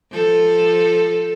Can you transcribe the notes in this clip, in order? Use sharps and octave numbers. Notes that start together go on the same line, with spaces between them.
F3 A4